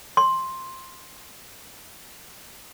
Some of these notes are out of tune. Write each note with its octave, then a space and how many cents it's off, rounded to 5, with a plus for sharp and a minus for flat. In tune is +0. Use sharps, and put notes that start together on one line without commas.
C6 +5